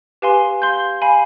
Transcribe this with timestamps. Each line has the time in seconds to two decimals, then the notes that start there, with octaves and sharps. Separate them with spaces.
0.22 G4 B4 F5 G#5 C6
0.62 F5 C6 G6
1.02 F5 G#5 B5